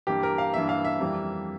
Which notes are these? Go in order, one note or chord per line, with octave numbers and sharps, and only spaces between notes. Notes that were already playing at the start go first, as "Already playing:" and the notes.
G2 E3 A#3 G4
A#4
F5
G2 E3 A#3 E5
F5
E5
F2 E3 G3 A#3